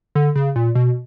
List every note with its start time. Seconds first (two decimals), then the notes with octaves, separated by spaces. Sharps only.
0.15 D3
0.36 C#3
0.56 A#2
0.75 B2